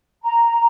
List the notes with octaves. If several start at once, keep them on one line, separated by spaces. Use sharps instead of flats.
A#5